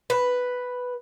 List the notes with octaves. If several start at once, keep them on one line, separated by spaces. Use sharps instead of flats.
B4